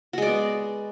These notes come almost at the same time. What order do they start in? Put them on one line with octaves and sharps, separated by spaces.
F#4 G#3 D5 B3